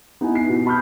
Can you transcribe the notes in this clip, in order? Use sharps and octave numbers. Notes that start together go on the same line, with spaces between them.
B3 D#4 E4 G#5
C7
B2
A5 B5 C#6 D#6 F6 G6